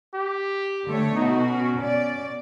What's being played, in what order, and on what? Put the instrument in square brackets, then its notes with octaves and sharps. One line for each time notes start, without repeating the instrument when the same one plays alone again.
[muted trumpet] G4
[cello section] D3 A3 C#5
[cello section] B2 F#4 [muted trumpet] D#4
[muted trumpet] C#4
[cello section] B2 D5